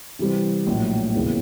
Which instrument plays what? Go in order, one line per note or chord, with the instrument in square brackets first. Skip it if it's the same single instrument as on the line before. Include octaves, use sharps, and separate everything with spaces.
[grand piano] C3 E3 G3 C4
A#1 A2 F#3
E1 D#2 C#3 E3